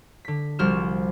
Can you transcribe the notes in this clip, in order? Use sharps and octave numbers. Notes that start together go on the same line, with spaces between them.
D3 B6
C2 F3 G3 F#4 F6 E7